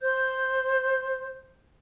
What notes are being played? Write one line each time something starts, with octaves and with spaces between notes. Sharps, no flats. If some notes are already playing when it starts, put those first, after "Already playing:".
C5 G6